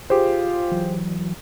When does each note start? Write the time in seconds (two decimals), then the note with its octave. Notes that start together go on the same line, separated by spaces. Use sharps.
0.10 F4 G4 G#4 C5
0.72 E3 F#3